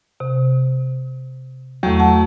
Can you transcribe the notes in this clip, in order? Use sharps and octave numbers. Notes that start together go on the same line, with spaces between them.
C3
E2 F#3 A3
F#5 A5